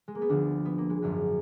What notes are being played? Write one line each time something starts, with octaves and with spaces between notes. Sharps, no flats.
G#3
A#3
B3
D2 D3 F3 D4
B3
A#3
G#3
G#1 F#2 D3 G#3